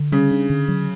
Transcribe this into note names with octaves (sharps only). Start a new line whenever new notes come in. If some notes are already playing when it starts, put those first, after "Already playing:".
Already playing: D3
C#3 G3
D4
D3
F#3